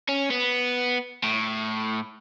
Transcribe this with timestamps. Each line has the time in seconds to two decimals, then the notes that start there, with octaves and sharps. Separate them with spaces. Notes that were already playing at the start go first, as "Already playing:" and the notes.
0.09 C#4
0.30 B3
1.24 A2